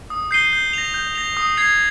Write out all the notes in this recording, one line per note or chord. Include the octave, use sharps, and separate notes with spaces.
D#6
G6 C7 D#7 G7
G6
A#6 F7
G6
A#6 F7
D#6
G#6 C7 F7